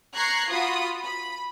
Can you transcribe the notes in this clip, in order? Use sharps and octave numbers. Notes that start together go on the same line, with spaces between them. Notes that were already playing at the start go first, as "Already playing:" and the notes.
A#5 C#6 F#6 G#6 C7
F4 F#4 B5 D#6
B5